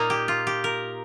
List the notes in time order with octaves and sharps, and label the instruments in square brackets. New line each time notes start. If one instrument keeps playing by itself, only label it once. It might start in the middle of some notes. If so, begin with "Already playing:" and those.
Already playing: [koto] A#2 A#3 D#4 A#5
G4
F4
G4
A#4